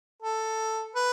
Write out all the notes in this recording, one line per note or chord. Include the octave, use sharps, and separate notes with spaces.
A4
B4